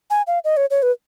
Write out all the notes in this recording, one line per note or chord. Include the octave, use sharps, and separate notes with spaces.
G#5
F5
D#5
C#5
C#5
B4